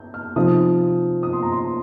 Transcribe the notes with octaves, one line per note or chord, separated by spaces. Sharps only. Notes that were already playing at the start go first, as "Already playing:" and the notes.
Already playing: G6
F6
C3 F3 D#4 D#6
D#6
C6
A#5
C6